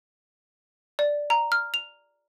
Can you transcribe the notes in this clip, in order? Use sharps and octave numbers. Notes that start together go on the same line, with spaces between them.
D5
A#5
F6
F7